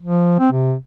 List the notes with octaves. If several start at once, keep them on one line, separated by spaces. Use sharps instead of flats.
F3
C4
C3